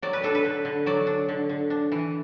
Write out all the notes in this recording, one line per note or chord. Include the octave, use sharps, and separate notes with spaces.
F#3 D5
B4
D4 A4
B4
D3
D3
F#3 D5
D4
D3
D3
D4
E3